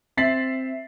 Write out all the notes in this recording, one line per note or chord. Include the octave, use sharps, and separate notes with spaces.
C4 E5 A6 B6 C7 F#7